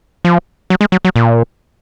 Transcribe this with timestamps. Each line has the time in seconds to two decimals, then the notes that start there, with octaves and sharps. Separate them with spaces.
0.25 F3
0.70 F#3
0.81 G#3
0.92 F#3
1.05 F#3
1.16 A#2